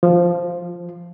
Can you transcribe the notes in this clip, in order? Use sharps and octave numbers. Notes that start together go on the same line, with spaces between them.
F3